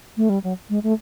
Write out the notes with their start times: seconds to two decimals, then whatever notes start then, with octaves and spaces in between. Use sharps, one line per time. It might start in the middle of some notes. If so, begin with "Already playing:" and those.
0.17 A3
0.29 G3
0.44 F#3
0.70 G#3
0.83 A3